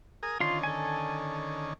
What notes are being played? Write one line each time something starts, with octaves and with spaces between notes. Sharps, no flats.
G#4 A#4 D#6
D3 D#3 C#4 F4 C6
A4 G#5